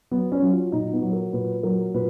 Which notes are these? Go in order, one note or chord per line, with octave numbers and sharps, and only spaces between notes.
F#3 B3
C#4
F#3
F4
A#2 D#4
B3
F#3
A#4
A#2 B4
F#3 A#4
A#2 B4